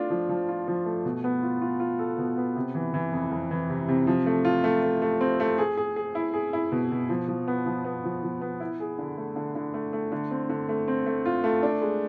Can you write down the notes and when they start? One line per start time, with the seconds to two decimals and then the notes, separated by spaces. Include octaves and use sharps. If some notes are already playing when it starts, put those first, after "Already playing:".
Already playing: A3 D4 F4
0.10 F3
0.29 F3
0.49 F4
0.68 F3
0.86 A3
1.05 B2
1.24 B3
1.42 F4
1.62 F4
1.80 F4
1.99 A4
2.18 B2
2.37 B3
2.56 C3
2.75 E3
2.94 E3
3.13 F2
3.31 F2
3.51 E3
3.69 C3
3.88 C3
4.07 F3
4.26 A3
4.45 F4
4.64 A3
4.83 A3
5.02 A3
5.21 C4
5.40 A3
5.58 G#4
5.77 G#4
5.96 G#4
6.15 E4
6.34 G#4
6.53 E4
6.72 B2
6.91 B2
7.09 F3
7.28 F3
7.48 B3
7.66 F3
7.85 B3
8.04 F3
8.23 F3
8.41 B3
8.60 E4
8.80 G#4
8.99 D3
9.18 A3
9.36 D3
9.55 D3
9.74 A3
9.93 A3
10.12 D3
10.31 C4
10.49 D3
10.69 A3
10.88 C4
11.06 A3
11.25 F4
11.44 A3
11.63 D4
11.82 G#3